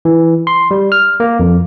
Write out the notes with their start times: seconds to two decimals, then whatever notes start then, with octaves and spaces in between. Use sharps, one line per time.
0.05 E3
0.47 C6
0.71 G3
0.92 F6
1.20 A#3
1.39 F2